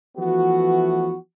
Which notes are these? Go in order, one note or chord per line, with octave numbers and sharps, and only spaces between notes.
E3 F3 A3 B3 F#4